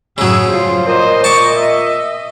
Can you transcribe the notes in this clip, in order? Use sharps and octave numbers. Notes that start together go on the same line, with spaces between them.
F#2 A2 C#3 F#3 G#4 E6
F3 G3 F4 C5
A#2 C5 D#5
A5 C#6 D6
E5